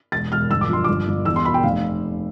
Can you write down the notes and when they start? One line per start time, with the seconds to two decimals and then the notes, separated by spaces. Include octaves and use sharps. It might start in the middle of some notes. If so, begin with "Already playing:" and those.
0.12 E1 A6
0.32 E1 F6
0.51 G1 E6
0.61 D6
0.69 F3 C6
0.84 G1 D6
1.07 G1
1.25 E2 E6
1.36 C6
1.45 B2 B5
1.54 G5
1.63 F1 F5